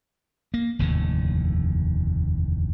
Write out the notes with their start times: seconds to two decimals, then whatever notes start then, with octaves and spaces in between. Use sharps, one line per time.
0.54 A#3
0.79 F1 D#2 A2 D3